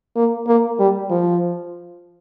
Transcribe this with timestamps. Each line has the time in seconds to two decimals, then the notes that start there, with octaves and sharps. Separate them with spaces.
0.16 A#3
0.47 A#3
0.80 G3
1.10 F3